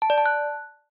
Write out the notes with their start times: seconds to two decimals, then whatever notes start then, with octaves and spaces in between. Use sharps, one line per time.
0.02 A5
0.10 D5
0.18 A5
0.26 F#6